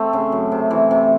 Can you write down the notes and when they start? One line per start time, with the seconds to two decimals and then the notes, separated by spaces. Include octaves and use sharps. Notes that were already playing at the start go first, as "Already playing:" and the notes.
Already playing: A3 C4
0.13 C#3
0.32 F#2
0.52 C3
0.71 E3
0.91 C3